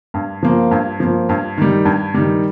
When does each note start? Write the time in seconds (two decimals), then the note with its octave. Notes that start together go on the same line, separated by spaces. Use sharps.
0.14 G2
0.43 F3 A#3
0.71 G2
1.00 F3 A#3
1.29 G2
1.58 D#3 G3
1.85 G2
2.14 D#3 G3